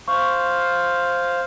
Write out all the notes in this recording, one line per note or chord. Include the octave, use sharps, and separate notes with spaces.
C5 F5 C#6